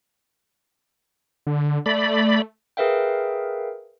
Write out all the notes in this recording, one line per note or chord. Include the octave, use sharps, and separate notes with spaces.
D3
A3 D5 B5
G#4 A#4 B4 E5 F5 G5